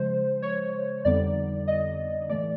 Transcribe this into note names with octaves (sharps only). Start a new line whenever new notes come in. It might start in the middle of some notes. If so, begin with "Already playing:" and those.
Already playing: C#3 F3 G#3 C5
C#5
F2 D3 G3 B3 D#4 D5
D#5
A2 E3 A3 D5